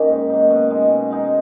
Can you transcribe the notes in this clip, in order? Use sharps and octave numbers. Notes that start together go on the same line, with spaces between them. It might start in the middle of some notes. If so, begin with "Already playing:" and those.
Already playing: D#3 A#3 C#4 D#4
G#2
F#3 A#3 D#4
B2
G#3 D#4 G#4
B2
G#3 D#4 G#4